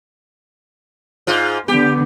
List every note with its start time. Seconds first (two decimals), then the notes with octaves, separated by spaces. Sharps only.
1.27 G#2 F4
1.68 D3 B3 G4